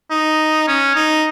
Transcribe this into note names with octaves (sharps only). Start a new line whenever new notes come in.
D#4
C#4
D#4